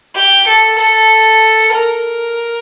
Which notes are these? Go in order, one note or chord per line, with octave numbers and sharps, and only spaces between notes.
G4
A4
A4
A#4